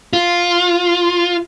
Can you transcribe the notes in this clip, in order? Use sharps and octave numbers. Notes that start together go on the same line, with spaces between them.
F4